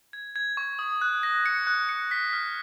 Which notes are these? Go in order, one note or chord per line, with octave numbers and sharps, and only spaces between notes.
G#6
G#6
C#6
D#6
F#6
A#6
C#7
F#6
C#7
B6
F6